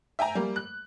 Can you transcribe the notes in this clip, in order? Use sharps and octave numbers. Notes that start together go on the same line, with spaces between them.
E5 G5 G#5 A#5
G3 A#3
F#6